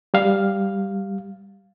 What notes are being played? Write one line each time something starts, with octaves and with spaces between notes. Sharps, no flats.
G3 F5